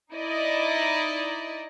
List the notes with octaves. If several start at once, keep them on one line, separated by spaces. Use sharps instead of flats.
D#4 E4 D5 D#5